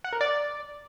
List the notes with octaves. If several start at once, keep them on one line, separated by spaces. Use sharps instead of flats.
F#5
A#4
D5